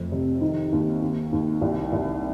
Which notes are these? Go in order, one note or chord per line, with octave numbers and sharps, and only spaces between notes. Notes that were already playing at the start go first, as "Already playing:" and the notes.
Already playing: F2 A3
C3
D#3
D#2
D#2
D#2
C2
C2